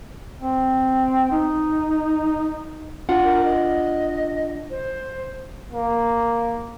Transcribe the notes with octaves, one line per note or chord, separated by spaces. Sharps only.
C4
D#4
D4 F4 F#5
A#4
D#5
C5
A#3